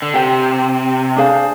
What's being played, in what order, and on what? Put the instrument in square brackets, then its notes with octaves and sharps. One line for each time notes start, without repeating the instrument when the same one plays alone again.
[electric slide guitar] D3
[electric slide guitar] C3 [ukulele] G4 C5 G5
[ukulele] D4 G#4 C5 F5